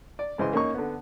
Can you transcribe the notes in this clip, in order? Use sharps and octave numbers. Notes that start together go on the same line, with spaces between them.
D5
G#2 C#3 E3 C5 D#5 C6
A#3 C#4 D#4 C#6
D3 B3